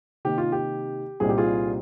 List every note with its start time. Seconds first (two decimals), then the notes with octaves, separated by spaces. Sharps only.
0.25 C3 D#3 A#3 G4
0.38 F4
0.52 G4
1.20 C2 A#2 G3 C4 D#4 G#4
1.29 G4
1.38 F4 G#4